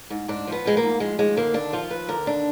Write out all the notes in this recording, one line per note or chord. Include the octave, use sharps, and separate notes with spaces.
G#2
G#2 D4
F3 B3
F3 G#3
A#3
G#2
F3 G#3
D#2 G#3
D3 A#3
D#2 D4
F3 F4
D#2 B4
D3 A#4
D#2 D4